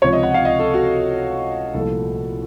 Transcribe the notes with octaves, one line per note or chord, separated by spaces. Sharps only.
C#2 C3 F3 C#5
D#5
F#5
F5
D#5
A4
F#4
C2 A#2 F3 A3 A4